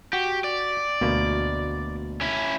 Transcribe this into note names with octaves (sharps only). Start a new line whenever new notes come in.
F#4 G4
D5
D2 B2 A#3
C#4 E4